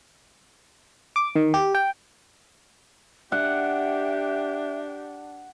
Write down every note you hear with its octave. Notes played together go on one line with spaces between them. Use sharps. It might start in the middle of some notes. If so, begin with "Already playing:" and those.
D6
D#3
G4
G5
D4 G4 E5 F#5